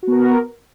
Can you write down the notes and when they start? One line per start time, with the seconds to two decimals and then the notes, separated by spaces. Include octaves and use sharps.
0.03 F#4
0.07 B3
0.12 A#4